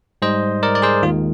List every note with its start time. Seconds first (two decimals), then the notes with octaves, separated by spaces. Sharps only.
0.22 G#2 G3 C5 D#5
0.63 A#4 D5
0.75 D5
0.82 G#4 C5
1.03 D#2 D#3 G#3 F4